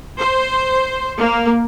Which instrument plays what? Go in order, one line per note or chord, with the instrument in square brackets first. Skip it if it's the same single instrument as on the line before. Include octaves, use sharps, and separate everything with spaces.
[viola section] C5
A#3